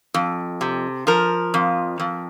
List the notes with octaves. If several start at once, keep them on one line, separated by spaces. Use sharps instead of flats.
F2
C3
F3 A#4
F2
F2